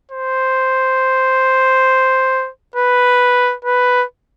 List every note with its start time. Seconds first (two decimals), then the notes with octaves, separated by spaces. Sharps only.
0.11 C5
2.76 B4
3.65 B4